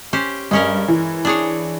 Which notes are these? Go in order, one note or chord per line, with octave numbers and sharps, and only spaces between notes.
C#4 G4 C5
G2 G#3 C#4 A#4
E3
D4 G#4 C#5